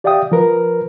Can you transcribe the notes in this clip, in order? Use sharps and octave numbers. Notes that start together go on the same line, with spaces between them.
G4 D5 E5 F5 G5 D#6
F3 A#4 B4